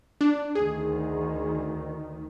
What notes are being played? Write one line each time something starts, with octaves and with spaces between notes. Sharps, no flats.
D4
D2 D#3 G#4